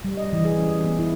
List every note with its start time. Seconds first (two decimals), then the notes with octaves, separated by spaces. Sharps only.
0.05 G3
0.17 D#5
0.33 E3
0.45 G#4
0.57 C#4
0.84 B3
0.99 E4